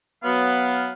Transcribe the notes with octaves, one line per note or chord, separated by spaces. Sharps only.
F#3 B3 F5